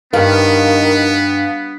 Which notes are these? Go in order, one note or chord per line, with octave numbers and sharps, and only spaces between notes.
G2 D#3 B3 F5